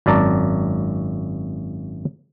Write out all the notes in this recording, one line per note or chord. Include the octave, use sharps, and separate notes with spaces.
G#1 F#2 D5 A5 A#5